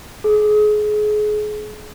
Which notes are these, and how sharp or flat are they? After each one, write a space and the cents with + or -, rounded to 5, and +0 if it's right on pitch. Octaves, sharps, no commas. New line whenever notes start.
G#4 +30